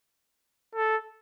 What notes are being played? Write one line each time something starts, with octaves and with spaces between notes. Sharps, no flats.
A4